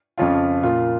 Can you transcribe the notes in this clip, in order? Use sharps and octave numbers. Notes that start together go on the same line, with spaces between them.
F2 C#3 F3 C#4 F4
A#2 A#3 F4